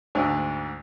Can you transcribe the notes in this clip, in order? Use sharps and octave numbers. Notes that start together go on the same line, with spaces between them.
D2 G#2 D4